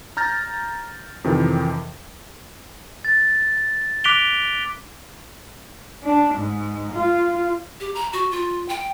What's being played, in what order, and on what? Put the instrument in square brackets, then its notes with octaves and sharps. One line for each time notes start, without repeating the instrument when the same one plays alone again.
[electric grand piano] A#5 F6 G6 A6 A#6
F2 C3 D#3 E3
[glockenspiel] A6
D6 F#6 B6 D7 F7 G7
[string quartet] D4
G#2
F4
[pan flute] G4
A#5
F#4
F4
G5